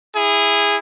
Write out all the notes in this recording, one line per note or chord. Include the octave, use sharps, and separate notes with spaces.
E4 G#4